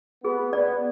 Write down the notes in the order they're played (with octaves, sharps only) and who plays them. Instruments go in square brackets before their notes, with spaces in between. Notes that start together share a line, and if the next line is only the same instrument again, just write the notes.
[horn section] B3 [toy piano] G#4
[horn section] B3 [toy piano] D5